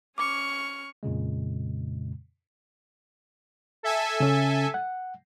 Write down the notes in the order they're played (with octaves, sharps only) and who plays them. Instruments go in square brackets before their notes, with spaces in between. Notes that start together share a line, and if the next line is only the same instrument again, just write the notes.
[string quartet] C#4 C#6 F6 [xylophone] D6
[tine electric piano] F2 A#2 C#3 G#3
[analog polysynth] A4 E5 G#5
[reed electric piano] C#3 C#4
F#5